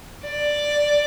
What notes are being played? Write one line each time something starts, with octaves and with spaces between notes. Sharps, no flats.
D5